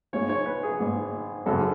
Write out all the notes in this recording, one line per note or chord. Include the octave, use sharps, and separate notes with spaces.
G#1 G#2 G#3 C#5
C#5
B4
G#4
G#1 G#2 G#3
G#1 F#2 C#3 G#3 A4